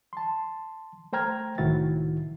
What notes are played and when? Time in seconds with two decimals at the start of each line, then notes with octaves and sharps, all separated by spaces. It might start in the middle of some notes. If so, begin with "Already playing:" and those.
0.13 A5 C6
1.13 A3 C5 G5 A#5 F6 G#6
1.58 C2 A2 D#3 E4 F#4 A6